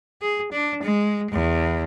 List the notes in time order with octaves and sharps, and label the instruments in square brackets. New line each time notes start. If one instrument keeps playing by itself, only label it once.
[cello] G#4
D4
G#3
E2